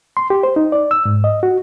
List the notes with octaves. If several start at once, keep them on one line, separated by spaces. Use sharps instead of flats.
C6
G4
C5
D#4
D5
E6
G#2
D#5
F#4